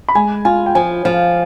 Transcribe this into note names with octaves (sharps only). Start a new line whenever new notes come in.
B5
G#3 G#5
F4 G#5
G5
F3 G#5
F3 F5